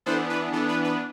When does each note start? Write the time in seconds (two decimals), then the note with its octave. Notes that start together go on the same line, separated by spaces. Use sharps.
0.06 E3 B3 D4 A4 C5
0.30 B4
0.52 E3 B3 D4 A4
0.69 B4
0.85 B4